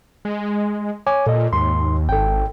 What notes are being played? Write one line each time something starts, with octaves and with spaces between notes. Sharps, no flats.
G#3
C#5 G#5 D6
A#2 A4 D#5
D#2 G#2 C6
G#1 A4 G5